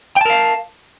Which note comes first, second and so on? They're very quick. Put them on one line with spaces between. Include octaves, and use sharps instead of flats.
G5 A5 A#4 F5